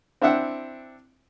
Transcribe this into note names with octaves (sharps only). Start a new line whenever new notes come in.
C4 D4 E4 E5 F#5 G5